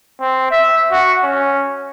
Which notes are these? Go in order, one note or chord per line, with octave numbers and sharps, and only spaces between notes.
C4
E5
F#4
C#4